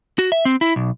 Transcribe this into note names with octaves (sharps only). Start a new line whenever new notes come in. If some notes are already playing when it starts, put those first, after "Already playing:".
F#4
E5
C4
E4
B1